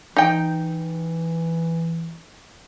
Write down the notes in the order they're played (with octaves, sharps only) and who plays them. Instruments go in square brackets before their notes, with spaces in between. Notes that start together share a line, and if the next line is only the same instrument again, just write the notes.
[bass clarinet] E3 [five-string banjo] D#4 G5